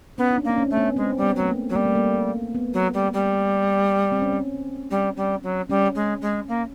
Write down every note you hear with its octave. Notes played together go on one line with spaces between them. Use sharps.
B3 C#4
D#4
D4
A#3
C4
C#4
A3
B3
G#3 C4
G3
B3
F#3 A3
A#3
F#3
G3 A#3
A3
A#3
B3
F#3
G3
G3
C4
C#4
C4
G3
G3
F#3
G3 C#4
G#3
G#3
A#3